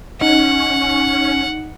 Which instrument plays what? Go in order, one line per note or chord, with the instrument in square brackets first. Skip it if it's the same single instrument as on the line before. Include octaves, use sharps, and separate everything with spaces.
[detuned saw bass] C#4 [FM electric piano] D#4 [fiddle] F#5